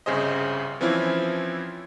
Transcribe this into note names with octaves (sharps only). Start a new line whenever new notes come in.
G1 C2 C#3 G#4 C5 D#5
E3 F3 C4 C#4 E4 F4